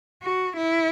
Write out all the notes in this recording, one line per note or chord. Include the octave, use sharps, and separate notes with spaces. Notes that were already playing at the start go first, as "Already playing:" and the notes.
F#4
E4